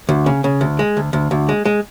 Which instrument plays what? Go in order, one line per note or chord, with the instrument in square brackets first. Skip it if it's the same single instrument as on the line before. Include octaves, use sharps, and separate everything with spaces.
[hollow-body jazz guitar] D2
C#3
C#3
D2
G#3
D2
D2
D2
G#3
G#3